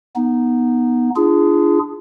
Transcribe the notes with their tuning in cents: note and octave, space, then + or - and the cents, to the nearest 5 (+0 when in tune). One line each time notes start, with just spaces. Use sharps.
B3 -15 D#4 +0
D4 +0 F4 -35 G#4 +0